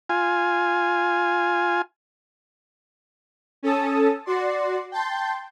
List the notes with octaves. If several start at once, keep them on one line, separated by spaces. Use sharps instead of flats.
F4 G#5
C#4 A4 A5 D#6
F#4 D5 C6
G5 A5 C6 G6